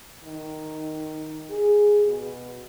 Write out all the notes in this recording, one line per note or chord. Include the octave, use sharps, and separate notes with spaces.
D#3
G#4
B2